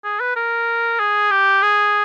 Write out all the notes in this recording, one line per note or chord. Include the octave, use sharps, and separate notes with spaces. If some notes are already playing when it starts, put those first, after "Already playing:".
G#4
B4
A#4
G#4
G4
G#4